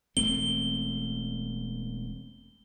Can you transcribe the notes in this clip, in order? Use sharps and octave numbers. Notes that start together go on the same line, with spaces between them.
E1 A3 C4 G7